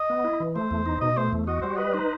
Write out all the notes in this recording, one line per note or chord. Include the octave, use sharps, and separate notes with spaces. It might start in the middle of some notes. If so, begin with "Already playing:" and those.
Already playing: D#5
B3
E4
E3
A3 C5
E2
D#4
B2 D#5
A3 C5
E2
F#4 D#5
G3 C5
B4 D#5
D#4 C5